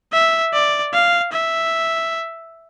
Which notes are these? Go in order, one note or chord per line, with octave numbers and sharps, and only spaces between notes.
E5
D5
F5
E5